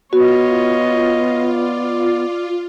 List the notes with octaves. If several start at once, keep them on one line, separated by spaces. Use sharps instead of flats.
B3 F4 F#4 C#5 D#5
D5